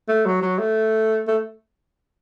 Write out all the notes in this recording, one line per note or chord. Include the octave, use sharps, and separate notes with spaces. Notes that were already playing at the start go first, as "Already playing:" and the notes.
A3
F#3
F#3
A3
A3